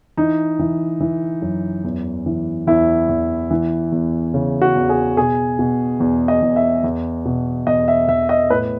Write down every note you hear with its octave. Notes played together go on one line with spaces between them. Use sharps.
E3 D#4
E3
E3
F#2
E2
E3
E2 E4
E2
E3
E2
C#3
F#4
E2
G#4
B2 G#4
B2
E2
D#5
E2
E5
E2
B2
E2 D#5
E5
E2 E5
D#5
A2 B4